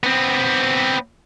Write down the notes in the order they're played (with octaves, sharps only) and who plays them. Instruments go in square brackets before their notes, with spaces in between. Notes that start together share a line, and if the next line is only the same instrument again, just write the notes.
[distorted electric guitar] B3 C4